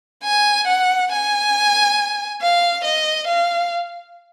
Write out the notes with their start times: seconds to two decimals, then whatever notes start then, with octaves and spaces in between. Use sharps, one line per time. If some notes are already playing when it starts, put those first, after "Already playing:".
0.24 G#5
0.68 F#5
1.11 G#5
2.42 F5
2.85 D#5
3.28 F5